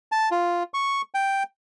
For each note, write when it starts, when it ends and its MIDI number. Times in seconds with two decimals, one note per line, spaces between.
0.12 0.29 81
0.31 0.63 65
0.74 1.02 85
1.14 1.43 79